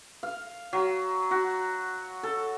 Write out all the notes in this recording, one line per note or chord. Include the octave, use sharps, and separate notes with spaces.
F5
F#3
F#4
A4